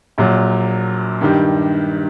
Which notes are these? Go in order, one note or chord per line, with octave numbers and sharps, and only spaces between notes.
A#1 A#2 F#3
G2 D#3 G3